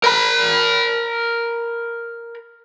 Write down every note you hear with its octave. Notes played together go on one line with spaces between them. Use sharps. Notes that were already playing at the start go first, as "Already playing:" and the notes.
A#4 B5